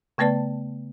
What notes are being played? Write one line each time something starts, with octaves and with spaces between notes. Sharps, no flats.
C#3 A3 B3 B4 D5 A5